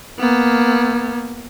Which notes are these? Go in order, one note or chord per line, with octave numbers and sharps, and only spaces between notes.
A#3 B3